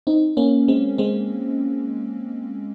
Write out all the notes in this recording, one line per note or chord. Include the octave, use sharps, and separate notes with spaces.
C4 D#4
A#3 C#4
G#3 C4
G#3 C4